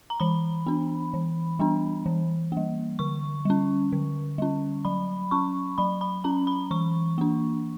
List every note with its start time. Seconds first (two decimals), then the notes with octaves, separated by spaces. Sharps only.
0.10 A#5
0.20 E3 B5
0.66 B3 D4
1.14 E3
1.59 G3 B3 D4
2.06 E3
2.52 G3 A#3
2.99 D3 C#6
3.45 G3 C#4
3.92 D3
4.38 G3 C#4
4.85 F#3 B5
5.31 C#4 C#6
5.78 F#3 B5
6.01 B5
6.24 C#4 A#5
6.47 B5
6.71 E3 C#6
7.18 A#3 D4